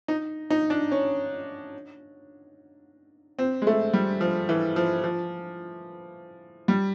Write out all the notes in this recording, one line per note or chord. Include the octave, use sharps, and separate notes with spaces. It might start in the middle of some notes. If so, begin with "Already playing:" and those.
D#4
D#4
D4
C#4
C4
G#3
A3
G3
F3
E3
F3
F3
G3